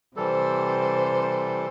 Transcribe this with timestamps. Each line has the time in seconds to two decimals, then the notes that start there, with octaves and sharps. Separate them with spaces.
0.17 C3 E3 G3 A4 C5